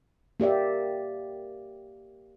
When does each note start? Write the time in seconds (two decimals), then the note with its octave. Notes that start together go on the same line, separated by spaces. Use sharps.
0.40 A#3 G4 D5 E5